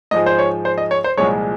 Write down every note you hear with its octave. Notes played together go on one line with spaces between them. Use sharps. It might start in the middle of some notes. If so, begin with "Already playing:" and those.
G#2 F3 G#3 D#5
C5
C#5
C5
D#5
C#5
C5
C2 A#2 F3 G#3 C#5